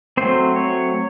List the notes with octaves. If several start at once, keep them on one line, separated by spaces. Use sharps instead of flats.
F#3 A3 C4 C5
C#5